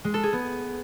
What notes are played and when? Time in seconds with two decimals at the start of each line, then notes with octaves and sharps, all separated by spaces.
0.04 G#3
0.14 A4
0.23 G#4
0.33 B3